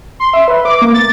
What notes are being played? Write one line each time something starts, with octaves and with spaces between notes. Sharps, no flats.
C6
E5
B4
D6
A#3
A6